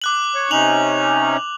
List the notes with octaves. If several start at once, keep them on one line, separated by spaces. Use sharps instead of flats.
D6 F#6 F#7
C#5
C3 C#4 D#4 F7 F#7